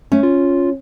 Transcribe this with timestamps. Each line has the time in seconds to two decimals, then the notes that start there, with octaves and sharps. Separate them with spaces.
0.12 A3 C#4
0.23 F4